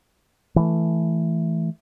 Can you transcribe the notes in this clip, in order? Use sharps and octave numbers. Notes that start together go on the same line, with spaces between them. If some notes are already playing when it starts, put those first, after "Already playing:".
E3 A3